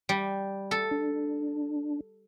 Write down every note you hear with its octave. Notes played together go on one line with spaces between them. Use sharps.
G3
A4
D4